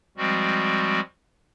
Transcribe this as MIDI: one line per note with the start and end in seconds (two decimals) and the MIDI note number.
0.17 1.00 53
0.17 1.00 55
0.17 1.00 56
0.17 1.00 60
0.17 1.00 66